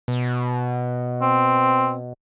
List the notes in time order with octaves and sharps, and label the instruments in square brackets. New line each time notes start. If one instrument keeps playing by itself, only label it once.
[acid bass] B2
[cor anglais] C4